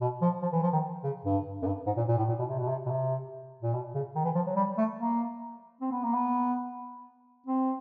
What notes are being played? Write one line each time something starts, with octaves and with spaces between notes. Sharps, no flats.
B2
F3
F3
E3
F3
D#3
C#3
G2
F#2
G2
G#2
A#2
A#2
A2
A#2
B2
C3
B2
C3
B2
C3
A#2
B2
C#3
D#3
E3
F3
F#3
G3
A3
A#3
C4
B3
A#3
B3
C4